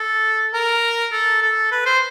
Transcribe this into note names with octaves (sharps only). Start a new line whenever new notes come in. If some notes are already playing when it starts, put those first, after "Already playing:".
Already playing: A4
A#4
A4
A4
B4
C5